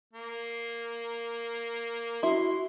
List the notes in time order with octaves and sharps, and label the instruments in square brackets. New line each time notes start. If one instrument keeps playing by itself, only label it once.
[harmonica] A#3
[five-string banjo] E4 [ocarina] F#4 [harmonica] C6